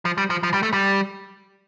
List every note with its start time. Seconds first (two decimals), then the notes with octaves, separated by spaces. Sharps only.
0.05 F3
0.18 G3
0.30 F3
0.43 F3
0.54 G3
0.63 A3
0.73 G3